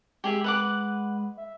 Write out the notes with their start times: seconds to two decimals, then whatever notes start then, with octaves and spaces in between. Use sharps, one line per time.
0.24 G#3 G4 G#4 E5
0.44 B4 F#5 D6
1.37 E5